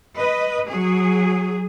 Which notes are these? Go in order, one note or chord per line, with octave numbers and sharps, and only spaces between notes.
B4 D#5
F#3 G#4